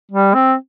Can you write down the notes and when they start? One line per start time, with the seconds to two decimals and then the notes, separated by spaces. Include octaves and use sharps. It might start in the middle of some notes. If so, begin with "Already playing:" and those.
0.11 G3
0.34 C4